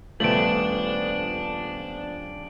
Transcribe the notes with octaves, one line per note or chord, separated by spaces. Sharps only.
D#1 F3 A3 B3 D4 D7 F#7